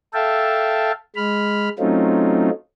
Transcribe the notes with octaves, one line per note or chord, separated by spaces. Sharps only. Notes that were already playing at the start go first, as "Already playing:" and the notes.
A4 E5 F5 G5 A5
G#3 B5 F6
F#3 A3 C4 C#4 D#4 F4